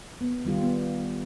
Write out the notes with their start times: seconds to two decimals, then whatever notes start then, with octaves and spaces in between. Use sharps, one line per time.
0.21 B3
0.45 D#3 G3 F4 G4
0.61 B3